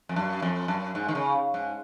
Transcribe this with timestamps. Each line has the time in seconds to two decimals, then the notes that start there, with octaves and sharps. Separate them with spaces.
0.09 F2
0.16 F#2
0.42 F2
0.68 F#2
0.95 G#2
1.08 D#3
1.15 C#3
1.54 G#2